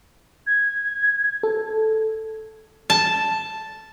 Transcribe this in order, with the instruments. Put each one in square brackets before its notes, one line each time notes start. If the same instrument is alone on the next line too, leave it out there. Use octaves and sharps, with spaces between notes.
[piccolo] G#6
[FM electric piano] A4
[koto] A5